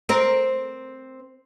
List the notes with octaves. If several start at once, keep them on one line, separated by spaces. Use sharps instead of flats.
C4 A#4